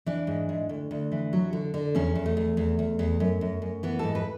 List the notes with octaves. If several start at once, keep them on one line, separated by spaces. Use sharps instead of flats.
E3 D4
G#2
G#2
D2
D2
E3
F#3
D3
D3
E2 C#4
E2
A3
E2
E2
E2
E2
F#2
F#2
F#2
E3 B3
G#2 A4
B4